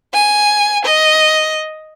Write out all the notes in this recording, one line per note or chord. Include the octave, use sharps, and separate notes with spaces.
G#5
D#5